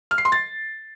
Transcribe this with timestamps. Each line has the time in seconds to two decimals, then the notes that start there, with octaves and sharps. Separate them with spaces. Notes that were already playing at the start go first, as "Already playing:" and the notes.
0.11 F6
0.18 C7
0.25 C6
0.32 A6